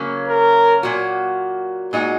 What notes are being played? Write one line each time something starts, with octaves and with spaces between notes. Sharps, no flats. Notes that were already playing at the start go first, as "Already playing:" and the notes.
Already playing: C#3 F#3 A#3 C#4
A#4
A#2 F#3 A#3 F#4
A#2 G#3 D#4 F#4